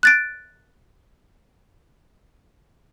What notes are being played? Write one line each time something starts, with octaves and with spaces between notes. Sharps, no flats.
F#6 A6 D7